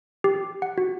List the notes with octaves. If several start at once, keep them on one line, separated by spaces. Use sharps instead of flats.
G4
F#5
F#4